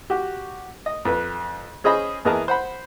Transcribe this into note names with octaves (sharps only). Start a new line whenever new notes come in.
F#4 G4
D#5
F2 B4
C#4 G#4 C5 D#5 B5
E2 B3 G#4 A#4 D#5 A5
C5 F#5 B5